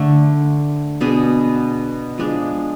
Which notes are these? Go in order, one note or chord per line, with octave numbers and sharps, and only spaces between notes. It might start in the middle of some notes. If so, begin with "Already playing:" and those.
Already playing: D3 A3 D4
B2 B3 D4 G#4
F3 G#3 D4 G#4